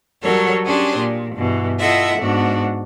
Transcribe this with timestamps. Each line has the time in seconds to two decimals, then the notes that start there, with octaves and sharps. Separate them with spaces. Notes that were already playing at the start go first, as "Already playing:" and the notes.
0.22 F#3 G3 A4 A#4 C#5
0.65 C#4 D4 G4 G#4 C6
0.96 A#2
1.35 G2 B2 E3
1.79 E4 F4 A4 D#5 E5 F#5
2.19 G#2 B3 D4 F#4